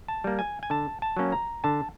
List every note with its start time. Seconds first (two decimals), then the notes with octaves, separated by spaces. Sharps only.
0.08 A5
0.24 G3 A#3
0.39 G#5
0.63 G#5
0.70 D3 A5
1.02 A5
1.17 F#3 A#3 C#4
1.32 A#5
1.64 D3 A5